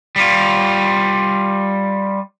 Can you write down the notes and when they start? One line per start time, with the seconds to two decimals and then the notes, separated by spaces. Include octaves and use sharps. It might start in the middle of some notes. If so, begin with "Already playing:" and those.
0.16 G3 F4